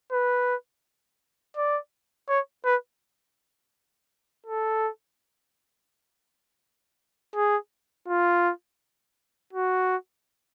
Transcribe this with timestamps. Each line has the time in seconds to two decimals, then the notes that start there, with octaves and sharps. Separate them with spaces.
0.12 B4
1.57 D5
2.29 C#5
2.65 B4
4.46 A4
7.35 G#4
8.08 F4
9.53 F#4